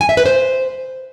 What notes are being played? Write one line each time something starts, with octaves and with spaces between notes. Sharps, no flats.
G#5
E5
B4
C5